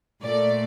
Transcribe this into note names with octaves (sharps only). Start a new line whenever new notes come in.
A#2 A3 D5